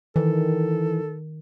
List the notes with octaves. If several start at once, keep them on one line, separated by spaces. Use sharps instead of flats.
D#3 E3 A4